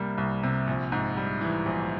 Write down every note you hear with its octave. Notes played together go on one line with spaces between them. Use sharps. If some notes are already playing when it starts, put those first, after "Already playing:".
Already playing: C2 C3 G3 A#3
C2
C3
A#1
G#2
G3
E3
A#1